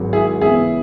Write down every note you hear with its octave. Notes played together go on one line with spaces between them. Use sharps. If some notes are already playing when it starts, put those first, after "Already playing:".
Already playing: G#1 G#2 F#3
E4 G#4
C#2 C#3 E3 B3 E4 G#4